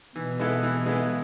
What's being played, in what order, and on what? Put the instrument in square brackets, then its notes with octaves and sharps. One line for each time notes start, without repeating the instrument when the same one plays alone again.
[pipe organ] B2 [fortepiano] E3
[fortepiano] G#3 B3 E4 A4
E3
G#3 B3 E4 A4